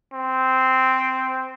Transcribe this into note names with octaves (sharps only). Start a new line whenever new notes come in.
C4